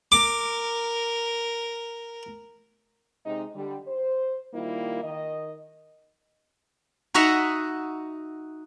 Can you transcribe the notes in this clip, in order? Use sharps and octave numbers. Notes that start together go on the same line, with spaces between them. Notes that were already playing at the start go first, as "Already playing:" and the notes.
A#4 D6
C3 G#3 D#4
D3 G3
C5
D#3 G3 A#3 E4 F4
D#3 D#5
D#4 F#4 D#5 E5 F#5 A#5